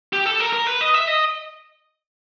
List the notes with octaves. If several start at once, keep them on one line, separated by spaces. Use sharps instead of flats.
G4
A4
A#4
A#4
B4
D#5
E5
D#5